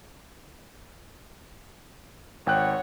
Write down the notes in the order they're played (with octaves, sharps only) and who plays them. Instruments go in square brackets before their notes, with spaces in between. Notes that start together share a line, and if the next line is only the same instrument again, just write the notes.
[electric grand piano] G#1 G5 F#6 [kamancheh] C#5 F#5